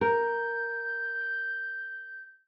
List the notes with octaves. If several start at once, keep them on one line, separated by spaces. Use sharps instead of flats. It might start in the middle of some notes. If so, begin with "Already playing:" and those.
A#4 G6